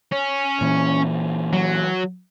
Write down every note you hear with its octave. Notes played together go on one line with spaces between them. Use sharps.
C#4
A#2 E3
F#3